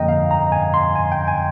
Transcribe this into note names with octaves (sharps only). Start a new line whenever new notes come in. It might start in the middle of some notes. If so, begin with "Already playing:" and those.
Already playing: F2 D3 F3 A#3 D#5 G5 A#5
F5
A#5
G#5
C6
G#5
G5
G#5